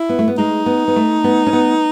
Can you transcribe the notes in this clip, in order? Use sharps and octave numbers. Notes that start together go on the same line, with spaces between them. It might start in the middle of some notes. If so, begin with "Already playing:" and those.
Already playing: E4
B3
A3
B3
G#3 D#4
B3
B3
A3
B3
C#4
B3